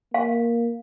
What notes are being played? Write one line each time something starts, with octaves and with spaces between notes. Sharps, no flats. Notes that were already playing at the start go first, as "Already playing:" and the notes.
A#3 F5